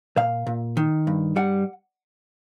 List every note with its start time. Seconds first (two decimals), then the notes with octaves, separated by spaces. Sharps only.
0.17 A#2 F5
0.47 A#2
0.77 D#3
1.07 G2
1.36 G3 F#5